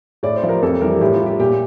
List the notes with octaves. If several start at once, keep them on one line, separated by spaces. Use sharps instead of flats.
A2 D5
C5
F3
A#4
F2 A4
E3 G3 A#4
A2 G4
F4
G3
G4
A#2 G4